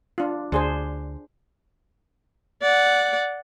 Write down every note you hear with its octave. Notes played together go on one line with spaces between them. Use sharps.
D4 F4
D2 D4 G#4 C5
D5 F#5